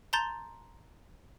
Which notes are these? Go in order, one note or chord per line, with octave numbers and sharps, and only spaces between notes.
A5 A#5 C6 G6 A6 G7